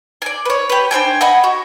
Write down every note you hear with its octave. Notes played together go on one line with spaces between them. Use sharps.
D5 G#5
B4 C#5
G4 B4
D4 C5 G5 G#5
D#5 F#5 G#5 B5
F#4